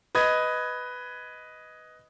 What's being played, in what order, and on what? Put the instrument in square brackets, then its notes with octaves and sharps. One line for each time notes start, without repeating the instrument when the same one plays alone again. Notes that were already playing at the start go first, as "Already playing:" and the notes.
[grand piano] B4 D#5 D#6 G#6